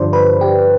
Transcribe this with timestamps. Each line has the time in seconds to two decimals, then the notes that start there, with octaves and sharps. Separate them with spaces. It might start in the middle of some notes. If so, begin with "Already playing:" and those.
Already playing: G2 D3 F3 C5 D5
0.13 B4
0.41 G4